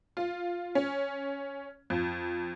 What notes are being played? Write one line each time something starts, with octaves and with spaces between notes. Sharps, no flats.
F4
C#4
F2